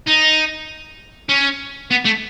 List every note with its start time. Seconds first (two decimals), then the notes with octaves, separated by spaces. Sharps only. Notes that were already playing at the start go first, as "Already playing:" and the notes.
0.07 D#4
1.29 C#4
1.91 B3
2.05 A3